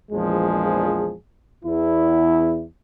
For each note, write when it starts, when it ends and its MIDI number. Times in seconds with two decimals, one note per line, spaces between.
0.12 1.14 34
0.12 1.14 40
0.12 1.14 53
0.12 1.14 56
0.12 1.14 68
1.64 2.64 40
1.64 2.64 64